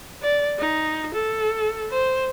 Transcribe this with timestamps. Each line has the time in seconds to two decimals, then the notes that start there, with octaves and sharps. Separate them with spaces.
0.23 D5
0.59 D#4
1.14 A4
1.91 C5